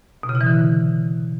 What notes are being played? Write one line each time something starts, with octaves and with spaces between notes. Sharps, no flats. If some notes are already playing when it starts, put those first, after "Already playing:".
B2
C#3
E4
E3
D3